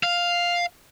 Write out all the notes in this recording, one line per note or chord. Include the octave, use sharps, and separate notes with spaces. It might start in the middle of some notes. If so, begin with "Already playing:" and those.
F5